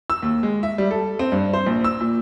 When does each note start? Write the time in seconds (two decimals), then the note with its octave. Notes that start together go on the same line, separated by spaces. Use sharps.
0.10 E6
0.22 D#2
0.43 G#3
0.63 E5
0.78 G3
0.91 A4
1.19 C4
1.32 G2
1.53 C5
1.66 A#1
1.84 E6
2.01 A#2